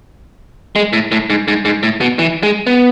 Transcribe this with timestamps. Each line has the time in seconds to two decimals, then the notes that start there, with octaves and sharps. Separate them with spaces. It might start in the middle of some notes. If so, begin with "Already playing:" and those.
0.76 G#3
0.93 A2
1.12 A2
1.30 G#2
1.48 G#2
1.65 G#2
1.83 A2
2.01 B2
2.19 E3
2.43 G#3
2.67 B3